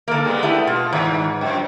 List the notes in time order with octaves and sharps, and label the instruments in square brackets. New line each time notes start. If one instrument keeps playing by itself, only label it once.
[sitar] D3 A#4 [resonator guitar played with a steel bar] A#3 A4
[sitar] G3 G#3 B3
[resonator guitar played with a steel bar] A3 E4 G4
[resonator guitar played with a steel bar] B2 [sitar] F4
[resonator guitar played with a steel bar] G#2 [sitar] D#3
[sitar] F#2 F3